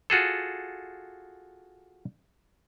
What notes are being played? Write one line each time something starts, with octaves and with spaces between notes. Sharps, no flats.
F4 F#4 G#4 A4